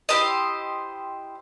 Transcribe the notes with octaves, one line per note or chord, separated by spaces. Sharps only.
E4 G4 C5 D#5